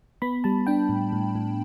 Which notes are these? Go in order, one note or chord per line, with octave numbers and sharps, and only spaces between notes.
B3 B5
G3 A5
D4 G5
A2
A2
A2